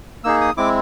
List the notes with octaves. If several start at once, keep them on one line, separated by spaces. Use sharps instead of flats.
A#3 D#4 G#4 E6
D#6
G#3 C4 E4 D6